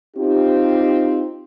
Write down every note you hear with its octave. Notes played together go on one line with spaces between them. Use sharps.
C4 D#4 F4 G4